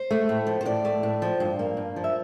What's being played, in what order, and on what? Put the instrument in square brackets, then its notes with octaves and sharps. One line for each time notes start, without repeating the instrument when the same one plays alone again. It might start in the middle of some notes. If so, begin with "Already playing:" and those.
Already playing: [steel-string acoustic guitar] C5
A3
A2
F3
C5
A2 D5
A3
A2
F3
G2
A#3
G2
F3
E5